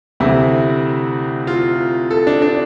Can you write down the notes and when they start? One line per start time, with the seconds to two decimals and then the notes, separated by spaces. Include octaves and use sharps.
0.20 D2 C3 E3 E4
1.47 F4
2.11 A4
2.27 D4
2.42 D4